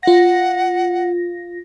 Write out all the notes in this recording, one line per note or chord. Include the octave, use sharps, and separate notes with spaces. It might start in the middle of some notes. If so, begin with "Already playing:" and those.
F4 F#5 A#6